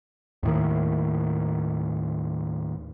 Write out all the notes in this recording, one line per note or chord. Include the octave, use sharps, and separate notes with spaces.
D#2 A2 D#3